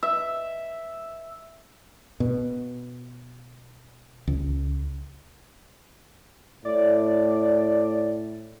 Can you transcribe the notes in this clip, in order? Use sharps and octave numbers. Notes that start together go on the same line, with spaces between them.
E5
B2
C#2
A2 D5